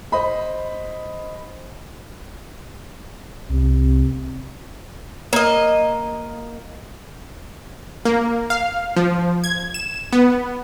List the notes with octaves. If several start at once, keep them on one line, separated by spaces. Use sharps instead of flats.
C5 D#5 B5
C2 C3
A#3 D#5
A#3
F5
F3
G#6
E7
B3